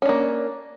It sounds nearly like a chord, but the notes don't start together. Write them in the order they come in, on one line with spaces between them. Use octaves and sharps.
C#4 D4 A#3